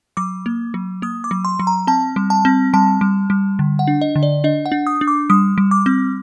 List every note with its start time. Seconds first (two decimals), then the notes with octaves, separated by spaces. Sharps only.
0.17 F#3 D6
0.46 A#3
0.74 F#3
1.02 A#3 D#6
1.24 D6
1.31 F#3
1.45 C6
1.59 F#3
1.67 A#5
1.87 C4 A5
2.16 G3
2.30 A5
2.45 C4
2.73 G3 A5
3.01 G3
3.30 G3
3.59 D3
3.79 F#5
3.87 D4
4.01 D#5
4.16 D3
4.23 D5
4.44 D4 D#5
4.66 F#5
4.72 D4
4.87 D#6
5.01 D4
5.07 D6
5.30 G3 D#6
5.58 G3
5.71 D6
5.86 C4